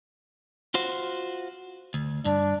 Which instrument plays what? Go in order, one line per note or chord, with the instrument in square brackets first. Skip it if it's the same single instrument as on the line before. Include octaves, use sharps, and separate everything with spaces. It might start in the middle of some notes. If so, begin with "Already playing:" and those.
[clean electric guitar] F4 F#4 C5
D2
[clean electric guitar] G2 [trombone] D4